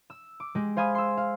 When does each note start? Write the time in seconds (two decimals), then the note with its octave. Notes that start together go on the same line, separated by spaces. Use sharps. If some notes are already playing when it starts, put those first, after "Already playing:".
0.10 E6
0.40 D6
0.55 G#3 G4
0.77 C5 F5 G#5 B5 D#6
0.95 C6 E6
1.17 F5